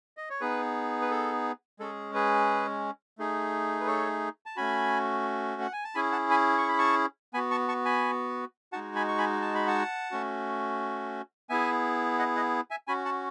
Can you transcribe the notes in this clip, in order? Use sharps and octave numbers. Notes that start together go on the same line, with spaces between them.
D#5
C#5
B3 D#4 G#4 B4
B4
A4
G#3 C#4 G#4 A4
G#4 B4
A3 D#4 G#4
B4
A4 C#5
A5
A3 C#4 F#4 G#5 B5
F#5
G#5
A5
C#4 E4 G#4 G#5 B5
F#5 A5
G#5 B5
C#6
B5
A5 C#6
B3 F#4 G#5 B5
A5 C#6
A5 C#6
G#5 B5
G#3 D#4 F#4 F#5 A5
G#5 B5
C#6
G#5 B5
A5
B5
F#5 A5
A3 C#4 F#4
B3 E4 G#4 E5 G#5
D#5 F#5
D#5 F#5
E5 G#5
C#4 F#4 G#5 B5
F#5 A5